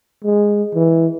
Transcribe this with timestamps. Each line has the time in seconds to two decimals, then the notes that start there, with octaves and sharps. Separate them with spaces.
0.24 G#3
0.75 E3